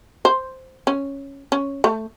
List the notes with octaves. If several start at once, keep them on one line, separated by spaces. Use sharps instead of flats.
C5
C#4
C#4
A3